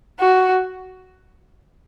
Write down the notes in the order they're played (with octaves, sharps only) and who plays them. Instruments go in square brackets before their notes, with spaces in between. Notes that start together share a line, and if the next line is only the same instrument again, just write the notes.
[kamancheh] F#4